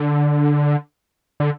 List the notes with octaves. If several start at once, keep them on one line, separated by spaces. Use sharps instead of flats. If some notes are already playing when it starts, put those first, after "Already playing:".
Already playing: D3
D3